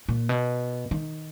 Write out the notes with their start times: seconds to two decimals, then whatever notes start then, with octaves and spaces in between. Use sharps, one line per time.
0.09 A#2
0.29 B2
0.91 D#3